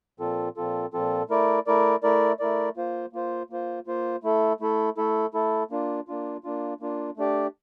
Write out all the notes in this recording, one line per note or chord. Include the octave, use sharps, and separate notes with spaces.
A#2 F3 C4 F4 A4
A#2 F3 C4 F4 A4
A#2 F3 C4 F4 A4
A3 E4 A#4 D5
A3 E4 A#4 D5
A3 E4 A#4 D5
A3 E4 A#4 D5
A#3 F4 C5
A#3 F4 C5
A#3 F4 C5
A#3 F4 C5
A3 E4 A4
A3 E4 A4
A3 E4 A4
A3 E4 A4
A#3 D4 F4
A#3 D4 F4
A#3 D4 F4
A#3 D4 F4
A3 D4 G4 D5